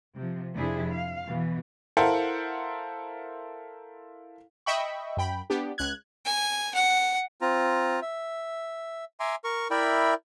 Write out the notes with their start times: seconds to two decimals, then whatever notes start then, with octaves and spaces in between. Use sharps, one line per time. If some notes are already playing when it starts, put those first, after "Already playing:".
0.16 C3 F3
0.54 F2 C3 D4 E4 G#4
0.93 F5
1.27 B2 E3
1.97 E4 A4 A#4 C5 F5 F#5
4.66 D#5 E5 G5 B5 C#6
5.17 F#2 G5 B5
5.50 B3 D4 G4
5.78 C#2 F#6 G#6
6.25 G#5
6.74 F#5
7.41 C4 F4 A#5
8.02 E5
9.20 E5 G#5 A#5 C6 D6
9.44 A#4 C#6
9.71 E4 A#4 D5 E5 G5 B5